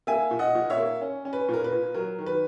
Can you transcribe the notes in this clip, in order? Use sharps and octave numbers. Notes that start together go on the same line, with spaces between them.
A#3 E5 G#5
A#2
D#5 F#5
A#2
C#5 E5
A#3
C#4
C#4
B4
A#2 A#4
B4
A#2
F#3 A#4
D#3
B4